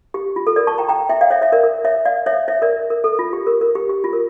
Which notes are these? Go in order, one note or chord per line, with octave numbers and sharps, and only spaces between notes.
G4
F4
A4
A#4 D5
A5 C#6
G5 A#5
G5 A#5
E5 G5
D5 F5
C#5 E5
C#5 E5
A#4 D5
A#4
C#5 E5
D5 F5
C#5 E5
C#5 E5
A#4 D5
A#4
A4
F4
G4
A#4
A#4
G4
G4
F4
A#4